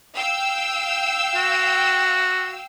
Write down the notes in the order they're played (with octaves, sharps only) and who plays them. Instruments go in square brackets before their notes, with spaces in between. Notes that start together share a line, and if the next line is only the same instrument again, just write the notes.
[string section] F5 G5 E6
[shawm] F#4